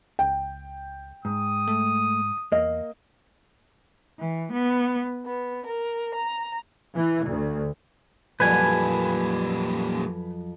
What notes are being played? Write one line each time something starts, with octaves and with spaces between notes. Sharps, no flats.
C#2 G5
G#2 D#6
A3
E2 A#3 D#5
E3
B3
B3
A#4
A#5
E3
D2
F2 A#2 F#3 G3 B4 G#5